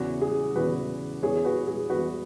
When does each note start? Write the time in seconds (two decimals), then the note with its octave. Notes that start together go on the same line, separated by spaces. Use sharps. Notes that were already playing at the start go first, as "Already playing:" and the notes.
Already playing: E2 C#3 E3 F#4
0.21 G#4
0.56 E2 C#3 E3 F#4 B4
1.23 E2 E3 G#4 C#5
1.45 F#4 B4
1.67 G#4
1.90 E2 E3 F#4 B4